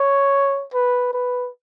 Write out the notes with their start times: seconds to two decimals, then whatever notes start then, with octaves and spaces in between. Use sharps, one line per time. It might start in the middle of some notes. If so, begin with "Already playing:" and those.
Already playing: C#5
0.74 B4
1.13 B4